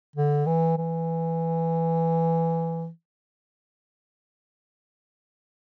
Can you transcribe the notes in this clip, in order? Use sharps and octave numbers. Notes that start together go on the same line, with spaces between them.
D3
E3
E3